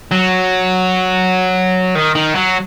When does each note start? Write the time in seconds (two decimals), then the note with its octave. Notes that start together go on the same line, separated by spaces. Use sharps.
0.11 F#3
1.95 D#3
2.15 D#3
2.35 F#3